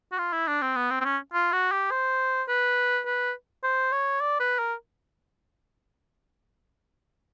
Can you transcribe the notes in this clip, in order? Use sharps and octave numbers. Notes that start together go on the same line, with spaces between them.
F#4
F4
E4
D4
C4
B3
C4
C4
C#4
F4
F#4
G4
C5
B4
B4
C5
C#5
D5
B4
A#4